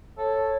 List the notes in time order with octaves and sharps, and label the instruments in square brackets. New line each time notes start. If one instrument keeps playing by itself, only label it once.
[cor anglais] A4 [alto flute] C#5